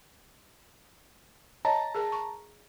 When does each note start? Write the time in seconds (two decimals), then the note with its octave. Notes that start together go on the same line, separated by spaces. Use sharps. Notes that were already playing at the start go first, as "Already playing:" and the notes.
1.65 C#5 D#5 A5 A#5
1.95 G#4 A#4
2.12 C#6